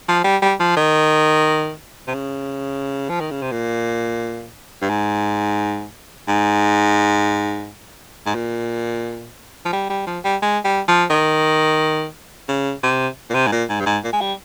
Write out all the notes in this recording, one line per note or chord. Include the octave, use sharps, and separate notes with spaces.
F3
G3
G3
F3
D#3
C3
C#3
F3
D#3
C#3
C3
A#2
G2
G#2
G#2
G#2
A#2
F3
G3
G3
F3
G3
G#3
G3
F3
D#3
C#3
C3
A#2
C3
G#2
A#2
G#2
G2
G#2
A#2
G#3
G3